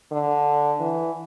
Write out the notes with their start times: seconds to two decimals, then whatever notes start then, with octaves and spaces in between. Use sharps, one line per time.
0.12 D3
0.80 E3